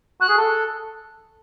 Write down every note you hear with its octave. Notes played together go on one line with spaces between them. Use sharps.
F#4 F#6
G#4
A4